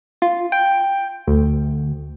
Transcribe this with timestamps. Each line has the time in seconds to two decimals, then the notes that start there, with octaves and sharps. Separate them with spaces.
0.22 F4
0.52 G5
1.27 D2